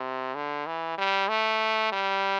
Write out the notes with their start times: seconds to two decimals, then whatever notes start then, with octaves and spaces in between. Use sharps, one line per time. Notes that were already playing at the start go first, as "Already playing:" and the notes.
Already playing: C3
0.35 D3
0.66 E3
0.98 G3
1.29 A3
1.92 G3